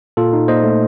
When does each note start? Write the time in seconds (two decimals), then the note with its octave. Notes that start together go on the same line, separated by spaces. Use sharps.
0.17 A#2 F4 A4
0.33 D#4
0.48 A#2 C5 D#5
0.64 A3